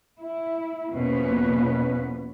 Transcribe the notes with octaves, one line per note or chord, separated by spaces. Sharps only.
E4
E2 B2 F3 A#3 C#4 B4